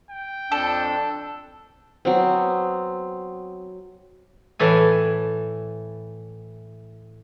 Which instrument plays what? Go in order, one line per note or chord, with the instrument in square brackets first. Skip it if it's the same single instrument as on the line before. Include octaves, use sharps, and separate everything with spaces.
[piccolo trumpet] G5
[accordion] F2 D4 [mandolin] A4
[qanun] F#3 B3 C4
[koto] A2 E3 A4 G#5